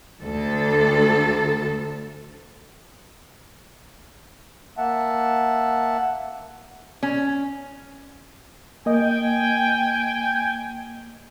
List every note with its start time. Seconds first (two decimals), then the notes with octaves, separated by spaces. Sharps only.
0.23 D2 A4
4.78 A#3 E5 F#5 A5
7.03 C#4
8.86 A#3 D#5 G5 G#5